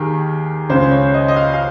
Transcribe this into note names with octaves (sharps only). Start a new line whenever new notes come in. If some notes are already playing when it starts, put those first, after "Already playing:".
Already playing: D#2 D#3 G4 G#4 A#4
C#2 C#3 C5
C#5
D#5
D#5
F5
F5